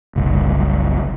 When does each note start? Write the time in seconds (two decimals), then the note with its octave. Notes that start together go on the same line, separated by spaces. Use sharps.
0.16 F#1 C2